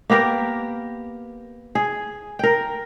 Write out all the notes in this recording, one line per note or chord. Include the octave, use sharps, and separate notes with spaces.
A#3 B3 G4 A#4
G#4
A#4 G5